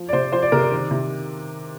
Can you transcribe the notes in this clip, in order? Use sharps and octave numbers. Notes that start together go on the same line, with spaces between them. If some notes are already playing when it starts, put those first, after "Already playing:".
Already playing: F3
D5
C3 C5
F3 C5
D5
C3 A#4
D5
D#3
C3